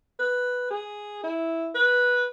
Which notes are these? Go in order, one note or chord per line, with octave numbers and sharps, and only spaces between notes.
B4
G#4
E4
B4